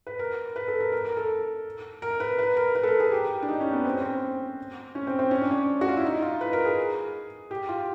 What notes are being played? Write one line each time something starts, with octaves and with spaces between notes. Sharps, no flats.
B4
A#4
B4
A4
A#4
A#4
A#4
A4
A#4
B4
B4
A#4
B4
A4
A#4
G#4
G4
D4
D#4
C#4
B3
C4
C#4
C4
C#4
C4
C4
C#4
D4
C#4
F#4
F4
E4
D#4
F4
B4
A#4
G#4
G4
F4